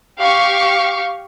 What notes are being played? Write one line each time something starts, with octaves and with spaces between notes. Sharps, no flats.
G4 F5 C#6